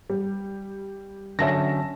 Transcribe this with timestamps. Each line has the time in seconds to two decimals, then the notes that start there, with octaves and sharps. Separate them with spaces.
0.10 G3
1.39 D3 F#3 C#4 E5 A5 A#6